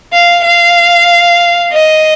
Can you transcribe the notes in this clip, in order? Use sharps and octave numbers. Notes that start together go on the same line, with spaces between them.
F5
F5
D#5